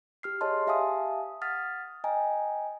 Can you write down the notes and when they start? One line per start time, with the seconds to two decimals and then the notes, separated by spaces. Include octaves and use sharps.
0.23 G4 F6 C7
0.41 G#4 C#5 D#5 A5 C6
0.67 G4 E5 F5 G#5 A5 D#6
1.41 F#5 D#6 F6 A6 B6
2.04 D#5 G5 G#5 A#5